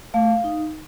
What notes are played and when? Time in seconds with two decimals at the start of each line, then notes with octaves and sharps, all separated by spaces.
0.14 A3 F5
0.44 D#4